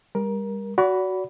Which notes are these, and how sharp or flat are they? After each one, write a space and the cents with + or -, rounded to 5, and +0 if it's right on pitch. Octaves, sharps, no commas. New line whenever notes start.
G3 +30 A#4 +20
F#4 +5 D5 -40 B5 +0